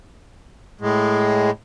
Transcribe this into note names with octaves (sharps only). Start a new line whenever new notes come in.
A2 G#3